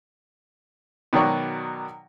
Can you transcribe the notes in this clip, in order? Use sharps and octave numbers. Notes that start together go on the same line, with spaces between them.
B2 D#3 F#3 D5 C#6